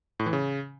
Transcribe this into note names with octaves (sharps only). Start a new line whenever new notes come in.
A2
E3
C#3